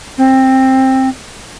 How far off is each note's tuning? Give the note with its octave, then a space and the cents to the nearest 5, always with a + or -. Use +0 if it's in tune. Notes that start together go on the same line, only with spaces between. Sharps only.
C4 +15